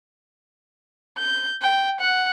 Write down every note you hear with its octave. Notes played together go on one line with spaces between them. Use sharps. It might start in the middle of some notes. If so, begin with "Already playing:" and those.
G6
G5
F#5